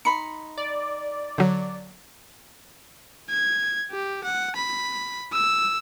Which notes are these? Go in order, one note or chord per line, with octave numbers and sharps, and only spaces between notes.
D#4 B5 C6 C#7
D5
D3 F#3
G#6
G4
F#5
B5
E6